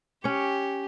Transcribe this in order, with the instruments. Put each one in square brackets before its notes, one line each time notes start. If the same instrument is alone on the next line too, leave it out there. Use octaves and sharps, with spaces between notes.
[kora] C#4 C#5 [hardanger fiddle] G4